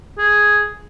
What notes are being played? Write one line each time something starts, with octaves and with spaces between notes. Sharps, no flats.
G#4